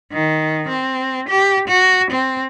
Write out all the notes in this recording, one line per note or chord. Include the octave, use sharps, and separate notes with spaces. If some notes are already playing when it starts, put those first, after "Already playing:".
D#3
C4
G4
F#4
C4